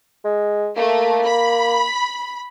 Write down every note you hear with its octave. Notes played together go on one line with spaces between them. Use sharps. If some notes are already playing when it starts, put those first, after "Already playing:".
G#3
A3 A#3
B5